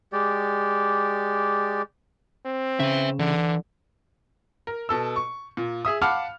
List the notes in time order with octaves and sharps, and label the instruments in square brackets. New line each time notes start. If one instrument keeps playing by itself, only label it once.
[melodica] G#3 G4 D5
[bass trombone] C4
[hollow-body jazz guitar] C#3 [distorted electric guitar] B4 E5
[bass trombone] D3 [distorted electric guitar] E3
[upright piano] A#4
B2 A4 E6
C#6
A#2
G#4 E5 D#6
F5 F#5 A5 B5 D6 F6